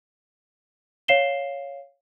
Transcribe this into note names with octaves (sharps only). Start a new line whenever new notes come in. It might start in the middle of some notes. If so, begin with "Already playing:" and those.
C#5 F5 C7 E7 G7